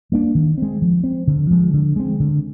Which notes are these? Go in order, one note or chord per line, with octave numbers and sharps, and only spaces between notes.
G3 A#3 D4
D#3
G#3 C4
F3
C4
D3
F3 G#3
D3
G#3 C4
D3